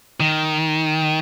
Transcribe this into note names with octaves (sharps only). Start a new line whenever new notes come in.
D#3